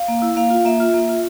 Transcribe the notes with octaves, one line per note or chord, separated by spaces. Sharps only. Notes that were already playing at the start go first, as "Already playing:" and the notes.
Already playing: F5
A#3
E4
A#3 F5
F4
A#3 E5
F4
A#3
F4